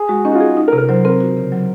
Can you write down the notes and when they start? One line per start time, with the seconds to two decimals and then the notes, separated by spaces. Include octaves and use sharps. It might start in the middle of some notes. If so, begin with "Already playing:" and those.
Already playing: G#4
0.09 G#3 F#4
0.25 C#4 D#4
0.32 F#4
0.35 F4
0.40 G#4
0.57 D#4
0.68 A#4
0.73 C3
0.78 A#4
0.89 F#3 C5
1.05 C4 A#4
1.20 F#4
1.37 C#3
1.52 F#3